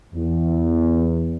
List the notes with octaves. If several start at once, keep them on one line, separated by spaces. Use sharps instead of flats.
E2